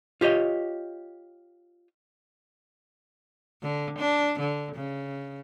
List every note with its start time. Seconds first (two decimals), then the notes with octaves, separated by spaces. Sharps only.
0.21 F4 G4 C#5 D#5
3.62 D3
3.98 D4
4.39 D3
4.75 C#3